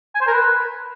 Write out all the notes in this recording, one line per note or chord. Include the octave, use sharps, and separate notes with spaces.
G#5
C5
A#4
B4